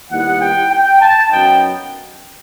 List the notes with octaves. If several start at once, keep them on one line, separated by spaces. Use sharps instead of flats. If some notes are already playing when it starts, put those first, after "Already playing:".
D#2 D#3 G3 B3 E4 F#5
G5
G5
A5
F#2 F#3 B3 D#4 G5